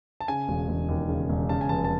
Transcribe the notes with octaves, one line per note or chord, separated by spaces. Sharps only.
A5
C#3 G#5
E1
E1
D#2
C#3
E1
C#3 A5
G#5
F1 A5
A5